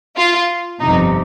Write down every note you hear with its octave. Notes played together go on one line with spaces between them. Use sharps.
F4
G1 F2 C3 D#4